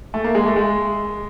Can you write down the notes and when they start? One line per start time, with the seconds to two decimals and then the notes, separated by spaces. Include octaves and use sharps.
0.14 A3
0.24 A#3
0.35 G#3
0.46 A3
0.56 G#3